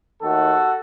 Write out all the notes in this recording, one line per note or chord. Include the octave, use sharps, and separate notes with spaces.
D#2 D#3 A3 F#4 A4